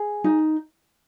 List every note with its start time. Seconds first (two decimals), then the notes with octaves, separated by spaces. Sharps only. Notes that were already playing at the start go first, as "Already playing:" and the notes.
Already playing: G#4
0.24 D#4